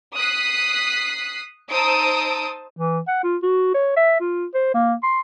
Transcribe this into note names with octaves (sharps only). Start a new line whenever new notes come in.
D#6 F#6 B6 C7
D#4 C5 A5 D#6 E6 D7
E3
F#5
F4
F#4
C#5
E5
F4
C5
A#3
C6